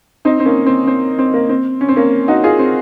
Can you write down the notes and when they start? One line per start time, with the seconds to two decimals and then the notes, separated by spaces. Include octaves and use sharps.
0.25 C4 D#4
0.40 C4
0.45 A#3 C#4
0.66 C4
0.87 C4
1.19 C4
1.34 A#3
1.49 C4
1.81 C#4
1.89 C4
1.96 A#3 C#4
2.28 D#4 F#4
2.44 F4 G#4
2.59 C4